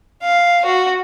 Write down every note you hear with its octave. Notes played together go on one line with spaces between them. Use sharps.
F5
F#4